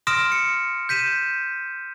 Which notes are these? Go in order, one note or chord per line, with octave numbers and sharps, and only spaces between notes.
C6 D#6 F6 A#6 D7 E7
C#7
G6 B6 D#7 E7